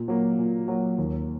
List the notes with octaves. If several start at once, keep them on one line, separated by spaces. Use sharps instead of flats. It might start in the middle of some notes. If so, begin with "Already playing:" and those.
Already playing: A#2
F#3 A#3
A#2
F#3 A#3
D#2